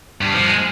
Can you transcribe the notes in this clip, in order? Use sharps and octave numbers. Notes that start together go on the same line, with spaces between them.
G2
F3
G#3